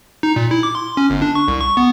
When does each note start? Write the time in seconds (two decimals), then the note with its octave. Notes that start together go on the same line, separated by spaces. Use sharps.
0.23 D#4
0.36 A#2
0.51 E4
0.63 D6
0.75 C6
0.97 C#4
1.10 G1
1.22 D4
1.35 C#6
1.48 C2
1.60 C#6
1.77 B3